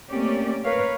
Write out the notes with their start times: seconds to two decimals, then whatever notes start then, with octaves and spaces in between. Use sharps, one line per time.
0.11 A3 A#3 C4 C#4 G4 D5
0.64 A#4 B4 C#5 F5